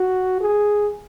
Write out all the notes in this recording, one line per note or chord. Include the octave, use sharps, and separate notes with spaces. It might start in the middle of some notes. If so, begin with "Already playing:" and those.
Already playing: F#4
G#4